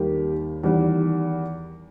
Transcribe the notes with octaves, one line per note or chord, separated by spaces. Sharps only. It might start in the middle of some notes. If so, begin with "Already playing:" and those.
Already playing: D#2 D#3 G3 A#3 G4
E2 D#3 G3